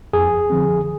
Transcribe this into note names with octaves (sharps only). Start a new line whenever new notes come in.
F2 G#4
D3 F3 C4